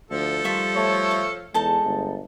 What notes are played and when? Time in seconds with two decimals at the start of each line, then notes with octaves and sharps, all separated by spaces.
0.11 D2 F3 A4
0.44 D#3 G3 A3 F4 E5 C#6
0.76 A3 C#5
1.11 F5
1.54 E2 G#3 D#4 A4 A5
1.84 G1